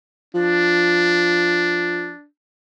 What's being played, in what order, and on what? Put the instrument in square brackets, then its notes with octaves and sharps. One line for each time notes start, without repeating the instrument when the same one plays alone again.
[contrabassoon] F3 [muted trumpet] D4